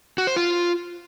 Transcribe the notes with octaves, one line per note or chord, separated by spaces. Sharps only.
F#4
C5
F4